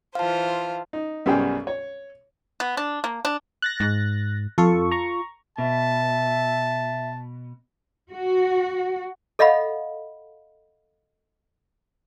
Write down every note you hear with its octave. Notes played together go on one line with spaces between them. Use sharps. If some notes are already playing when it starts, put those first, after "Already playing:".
E3 F4 C5 F5 A5
D#4
B1 F#2 G3 G#4 G5
C#5
B3
D4
A#3
D4
F#6 A6 A#6
G#2
F2 F4 A4 C#6
A#5 C#6
B2 E5 A5
F#4
A4 D#5 F5 F#5 B5